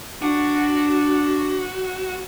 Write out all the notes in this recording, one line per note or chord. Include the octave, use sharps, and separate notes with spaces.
D4 F#4